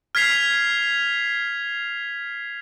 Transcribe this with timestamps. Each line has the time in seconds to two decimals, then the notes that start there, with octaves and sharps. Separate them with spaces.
0.15 F6 G#6 B6 C7 F7